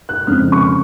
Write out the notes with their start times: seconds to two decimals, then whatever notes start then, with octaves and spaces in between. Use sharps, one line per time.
0.09 F#6
0.27 F2 C#3 G#3 F6
0.52 C#6